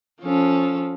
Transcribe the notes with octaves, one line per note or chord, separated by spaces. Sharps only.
F3 C#4 A4